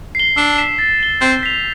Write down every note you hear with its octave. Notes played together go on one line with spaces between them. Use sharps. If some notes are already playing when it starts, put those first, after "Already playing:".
C7 G7
D4 E6
B6 E7 G7
A6
E7 G7
C4 G6
B6 F7